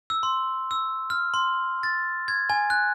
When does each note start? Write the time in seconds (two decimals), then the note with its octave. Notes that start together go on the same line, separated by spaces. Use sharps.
0.10 E6
0.23 C6
0.71 E6
1.10 F6
1.34 C6
1.83 A6
2.28 G#6
2.50 G#5
2.70 F#6